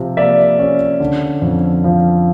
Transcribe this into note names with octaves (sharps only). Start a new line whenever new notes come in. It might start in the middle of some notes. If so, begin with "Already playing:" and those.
Already playing: C3 F3
A#3 D5 E5
C#4
D3
F2
F3